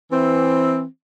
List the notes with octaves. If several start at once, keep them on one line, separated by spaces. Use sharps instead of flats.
E3 C4